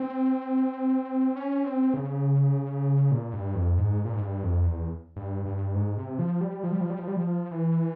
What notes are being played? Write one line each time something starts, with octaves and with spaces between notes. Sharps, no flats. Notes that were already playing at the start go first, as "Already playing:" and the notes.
Already playing: C4
C#4
C4
C#3
A#2
G2
F2
G#2
A#2
G#2
G2
F2
E2
G2
G2
G#2
C3
F3
G3
F3
G3
F3
G3
F3
G3
F3
E3